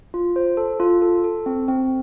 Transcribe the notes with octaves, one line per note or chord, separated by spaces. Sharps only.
F4
C5
A4
F4
A4
A4
C4
C4